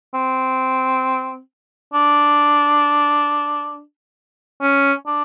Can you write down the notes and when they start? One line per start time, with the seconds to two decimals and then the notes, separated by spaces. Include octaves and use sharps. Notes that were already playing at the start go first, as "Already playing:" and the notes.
0.14 C4
1.93 D4
4.62 C#4
5.07 D4